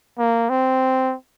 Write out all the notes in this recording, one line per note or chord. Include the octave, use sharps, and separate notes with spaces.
A#3
C4